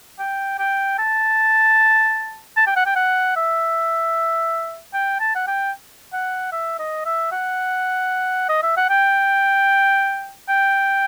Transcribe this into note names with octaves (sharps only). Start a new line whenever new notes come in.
G5
G5
A5
A5
G5
F#5
G5
F#5
E5
G5
A5
F#5
G5
F#5
E5
D#5
E5
F#5
D#5
E5
F#5
G5
G5